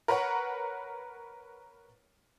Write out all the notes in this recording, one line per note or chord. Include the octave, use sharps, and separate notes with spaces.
A#4 B4 C#5 F#5